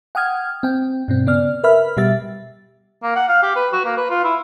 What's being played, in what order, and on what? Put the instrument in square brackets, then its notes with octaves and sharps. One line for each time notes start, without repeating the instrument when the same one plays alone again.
[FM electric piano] F#5 G5 D#6 F6 G#6
C4 G5
G2 B2 C4
C#3 B3 D5 F6
A#4 B4 E5 B5 F6
B2 G3 G4 E5 A6
[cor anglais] A#3
F#5
F5
G4
B4
F#4
A#3
B4
F4
E4